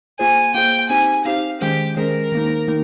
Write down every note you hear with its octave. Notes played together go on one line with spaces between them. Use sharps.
A#3 F4 G#4 C5 G#5
A#3 F4 G#4 C5 G5
C4 D#4 G4 C5 G#5
C4 D#4 G4 C5 F5
D#3 G#3 C#4 G4 G#4 C5
D#3 G#3 C#4 G#4 A#4 C5
D#3 A#3 D#4
D#3 A#3 D#4